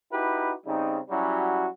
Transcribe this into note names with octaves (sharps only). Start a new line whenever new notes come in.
D#4 E4 F#4 G4 B4
C#3 G3 C4 D#4
F#3 G3 C#4 E4 F#4